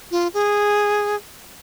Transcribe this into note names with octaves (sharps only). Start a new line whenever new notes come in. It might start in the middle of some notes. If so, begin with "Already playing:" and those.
F4
G#4